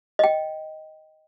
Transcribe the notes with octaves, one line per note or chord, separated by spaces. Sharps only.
D#5 G5